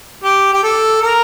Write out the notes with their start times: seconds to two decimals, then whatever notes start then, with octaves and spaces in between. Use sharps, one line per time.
0.24 G4
0.53 G4
0.63 A4
1.02 A#4